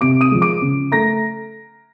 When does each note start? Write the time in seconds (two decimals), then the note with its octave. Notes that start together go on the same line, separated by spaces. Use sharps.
0.01 C3 D6 D7
0.21 D#6 D#7
0.31 F3 G#3
0.42 D6 D7
0.61 C#3
0.92 A3 A#5 A#6